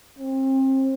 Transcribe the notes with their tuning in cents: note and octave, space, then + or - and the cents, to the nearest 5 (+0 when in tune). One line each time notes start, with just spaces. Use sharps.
C4 +30